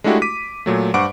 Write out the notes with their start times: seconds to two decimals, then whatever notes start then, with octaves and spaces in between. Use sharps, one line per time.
0.04 G#3 A3 D4 E4 F#4 G4
0.22 D6 B6 D#7
0.66 A#2 F#3 A3
0.94 G2 C5 F#5 C#6 D6 D7